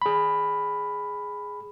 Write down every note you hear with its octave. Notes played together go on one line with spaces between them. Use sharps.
G#4 B5